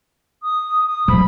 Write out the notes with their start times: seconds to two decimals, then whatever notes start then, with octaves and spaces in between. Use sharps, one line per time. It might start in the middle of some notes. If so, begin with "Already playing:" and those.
0.43 D#6
0.86 D#6
1.08 F3 F#3 B5